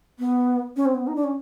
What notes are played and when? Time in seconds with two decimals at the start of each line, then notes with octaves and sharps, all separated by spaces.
0.19 B3
0.76 C#4
0.85 C4
0.95 B3
1.07 D#4
1.16 D4
1.24 C#4